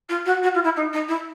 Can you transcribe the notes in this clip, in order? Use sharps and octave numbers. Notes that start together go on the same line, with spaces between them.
F4
F#4
F#4
F4
E4
D#4
D#4
E4